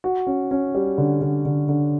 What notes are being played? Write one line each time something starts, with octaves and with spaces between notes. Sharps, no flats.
F#4
C#4
C#4
G3
D3
D3
D3
D3